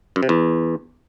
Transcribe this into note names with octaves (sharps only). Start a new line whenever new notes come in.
F#2
C3
E2